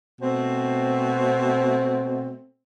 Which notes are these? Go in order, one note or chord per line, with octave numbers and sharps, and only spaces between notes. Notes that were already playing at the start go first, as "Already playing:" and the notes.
B2 A3 C4